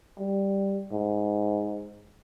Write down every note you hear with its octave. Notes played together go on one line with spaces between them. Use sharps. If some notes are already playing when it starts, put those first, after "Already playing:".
G3
G#2